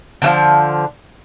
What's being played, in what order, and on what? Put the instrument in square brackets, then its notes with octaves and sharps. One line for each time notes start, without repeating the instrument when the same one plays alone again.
[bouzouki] D3 E3 F3